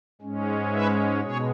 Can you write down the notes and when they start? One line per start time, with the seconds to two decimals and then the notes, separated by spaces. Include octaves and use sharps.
0.22 G#2 G#3 C#4
0.72 B4 E5
1.22 B2 G#3 G#4 C#5